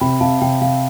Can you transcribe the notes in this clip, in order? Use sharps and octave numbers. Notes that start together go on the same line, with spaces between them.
C3 G5 B5
C3 F5 A5
C3 G5
C3 F5